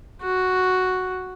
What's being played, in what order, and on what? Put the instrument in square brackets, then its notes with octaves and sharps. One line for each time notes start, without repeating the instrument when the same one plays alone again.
[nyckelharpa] F#4